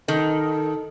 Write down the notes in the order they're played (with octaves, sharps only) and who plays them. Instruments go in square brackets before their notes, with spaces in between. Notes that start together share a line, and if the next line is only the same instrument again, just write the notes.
[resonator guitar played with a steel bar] D#3 [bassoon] A4